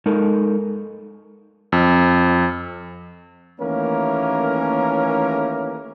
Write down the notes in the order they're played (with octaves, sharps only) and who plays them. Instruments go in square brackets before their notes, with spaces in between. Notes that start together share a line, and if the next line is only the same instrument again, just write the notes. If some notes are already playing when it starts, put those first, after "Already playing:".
[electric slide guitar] G#3 D#4 A4 A#4
[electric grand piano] F2
[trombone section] D#2 E3 A3 A#3 C#4 A#4